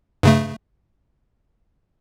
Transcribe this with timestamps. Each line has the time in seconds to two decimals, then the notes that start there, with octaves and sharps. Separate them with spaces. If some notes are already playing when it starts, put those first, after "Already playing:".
0.23 G2 C#3 A3